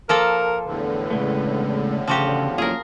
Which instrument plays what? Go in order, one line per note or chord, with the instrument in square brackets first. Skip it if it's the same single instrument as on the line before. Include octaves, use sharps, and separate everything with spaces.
[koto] F3 A#3 A4 [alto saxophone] A#4
[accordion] E2 A2 D3 [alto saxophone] B4
[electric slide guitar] C#3 G#3 A3
[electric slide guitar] C#3 [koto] F3 F#4 G4
[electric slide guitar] F#3 A#3 F4 [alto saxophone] C#4 [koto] G#4 A#4